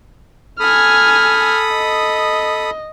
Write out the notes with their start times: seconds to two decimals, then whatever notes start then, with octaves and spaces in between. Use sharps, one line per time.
0.60 A4 G#5 B5 D#6 F6
1.74 D#5